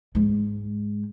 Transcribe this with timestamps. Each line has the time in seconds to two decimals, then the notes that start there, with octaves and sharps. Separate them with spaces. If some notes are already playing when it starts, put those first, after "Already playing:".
0.15 G#2 G#3